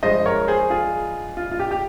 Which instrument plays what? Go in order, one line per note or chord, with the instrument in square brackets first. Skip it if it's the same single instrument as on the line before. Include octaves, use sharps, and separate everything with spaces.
[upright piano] G2 F3 G#3 C5 D#5
A#4 C#5
G#4 C5
F4 G#4
F4
F4
G4
G4